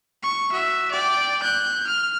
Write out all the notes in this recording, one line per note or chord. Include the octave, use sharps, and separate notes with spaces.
C#6
F#4 E5
D5 G5
F#6 G6
F6